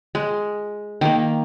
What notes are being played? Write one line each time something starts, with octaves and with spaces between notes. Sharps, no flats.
G#3
D#3 A#3